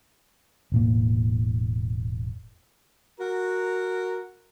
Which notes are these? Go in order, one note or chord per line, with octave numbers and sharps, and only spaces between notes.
E1 A2 A#3
F#4 A#4